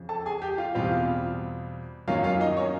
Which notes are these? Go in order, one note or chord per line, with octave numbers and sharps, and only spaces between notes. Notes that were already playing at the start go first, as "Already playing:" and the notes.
Already playing: F2 C#3 F3
A4 A5
G#4 G#5
G4 G5
F4 F5
E2 B2 G3 C4 F4 F5
F#2 D#3 F#3 A#3 C#4 F4 F5
F4 F5
D#4 D#5
C#4 C#5